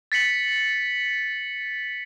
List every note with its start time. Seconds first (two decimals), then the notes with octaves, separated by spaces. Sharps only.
0.12 A6 B6 C#7 F#7